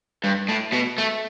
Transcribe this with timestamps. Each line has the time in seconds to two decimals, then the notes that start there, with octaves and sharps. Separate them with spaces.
0.24 G2
0.49 A2
0.73 B2
0.98 A3